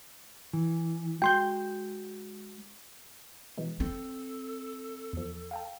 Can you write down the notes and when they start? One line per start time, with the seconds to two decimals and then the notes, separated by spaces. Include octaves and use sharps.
0.53 E3
1.22 G#3 F#4 G5 C6 G6
3.58 B2 E3 G#3
3.80 C4 A4
5.13 E2 F3
5.51 F5 G5 A5